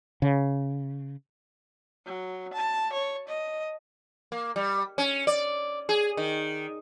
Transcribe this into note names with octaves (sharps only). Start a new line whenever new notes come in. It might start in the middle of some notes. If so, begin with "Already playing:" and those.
C#3
F#3
A5
C#5
D#5
A#3
G3
C#4
D5
G#4
D#3